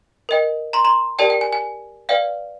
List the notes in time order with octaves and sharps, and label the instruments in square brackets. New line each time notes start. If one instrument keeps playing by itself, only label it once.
[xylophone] A#4 D#5 G5
A#5 C6
A#5 C6
G4 A#4 D5 G5 A5
G5
G#5
G#5
B4 D5 F5 G5